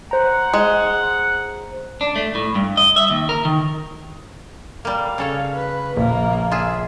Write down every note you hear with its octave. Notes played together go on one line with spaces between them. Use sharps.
C5 F#5 A#5
G#3
D4
A3
A2
G2
D#5
E5
D#2
A#4
D#3
G3 A#3 F5
C#3 A4 C#5
B4
A#1 A#3
F4 G#4 E5